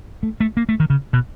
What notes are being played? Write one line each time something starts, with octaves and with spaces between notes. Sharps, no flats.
A3
A3
A#3
A3
D#3
C#3
B2